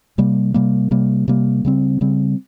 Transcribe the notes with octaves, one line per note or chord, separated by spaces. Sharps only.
C3 G3 A#3
C3 G3 A#3
C3 G3 A#3
C3 G3 A#3
C#3 G3 C4
C#3 G3 C4